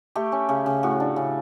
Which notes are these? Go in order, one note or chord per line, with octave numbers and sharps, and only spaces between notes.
A3 G4
C#4
C#3
C#3
A2 F#4
D4
C#3